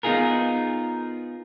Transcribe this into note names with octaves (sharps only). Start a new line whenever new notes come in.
B3 D#4 F4 G#4 A#4